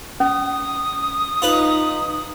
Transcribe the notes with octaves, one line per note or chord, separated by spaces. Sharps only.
C#4 D#6
D#4 F4 B4